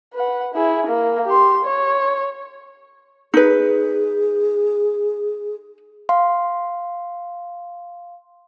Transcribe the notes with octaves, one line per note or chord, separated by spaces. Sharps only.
B4 F#5
E4 G#4
A#3
G4 C6
C#5
D#4 G#4 B4
F5 C6